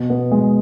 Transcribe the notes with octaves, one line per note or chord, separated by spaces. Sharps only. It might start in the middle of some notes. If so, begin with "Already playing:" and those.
Already playing: B2
B3
G#3